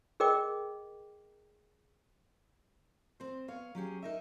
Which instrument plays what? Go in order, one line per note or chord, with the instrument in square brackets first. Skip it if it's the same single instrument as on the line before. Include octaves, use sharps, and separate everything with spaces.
[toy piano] G#4 A#4 D#5 G5 D6
[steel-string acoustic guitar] C4 C5
B3 C#5 F5
F#3 C#4 G4 G#4
D#4 A#4 E5